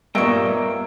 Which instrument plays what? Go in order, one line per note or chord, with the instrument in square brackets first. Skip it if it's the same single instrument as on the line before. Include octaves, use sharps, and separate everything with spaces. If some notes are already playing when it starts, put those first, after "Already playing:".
[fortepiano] G2 A#2 [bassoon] A#3 [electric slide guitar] B3 D#5 G5 [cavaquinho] E5 C#6